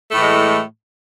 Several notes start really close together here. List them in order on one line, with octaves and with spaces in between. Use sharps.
A3 A2 E3 G#3